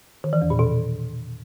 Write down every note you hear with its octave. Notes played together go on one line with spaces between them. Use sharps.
D#3
E3
E2
A#2
B2